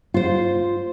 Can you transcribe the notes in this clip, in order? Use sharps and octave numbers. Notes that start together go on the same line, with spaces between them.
F4 C5